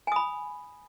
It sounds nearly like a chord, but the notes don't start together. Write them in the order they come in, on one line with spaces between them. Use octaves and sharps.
G#5 D#6 B5